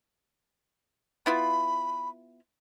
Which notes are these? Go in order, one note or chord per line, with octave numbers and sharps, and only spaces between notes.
B3 E4 F4 B5